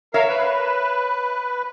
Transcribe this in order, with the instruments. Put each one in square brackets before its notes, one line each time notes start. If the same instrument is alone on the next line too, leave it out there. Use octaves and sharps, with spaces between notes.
[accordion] A#4 F5 [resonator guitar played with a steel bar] C#5 E5
[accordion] B4